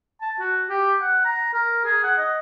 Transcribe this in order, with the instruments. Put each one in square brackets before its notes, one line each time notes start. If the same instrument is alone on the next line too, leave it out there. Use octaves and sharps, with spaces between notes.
[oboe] A5
F#4
G4
F#5
A#5
A#4
G#4
F#5
D#5